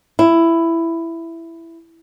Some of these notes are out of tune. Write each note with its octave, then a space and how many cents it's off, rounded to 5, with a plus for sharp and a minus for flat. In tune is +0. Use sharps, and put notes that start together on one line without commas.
E4 +10